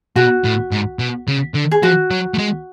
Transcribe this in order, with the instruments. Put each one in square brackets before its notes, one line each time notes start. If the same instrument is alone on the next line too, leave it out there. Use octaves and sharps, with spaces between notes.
[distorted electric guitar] B2 [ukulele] F#4
[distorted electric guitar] A2
G#2
B2
C#3
D3
[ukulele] G#4
[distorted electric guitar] F3 [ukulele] F#4
[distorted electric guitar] F#3
A3
G#3